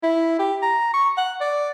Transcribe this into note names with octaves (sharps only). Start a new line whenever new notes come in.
E4
G4
A#5
C#6
F#5
D5